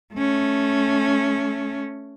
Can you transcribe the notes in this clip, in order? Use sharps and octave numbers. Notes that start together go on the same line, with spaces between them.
A3 C#4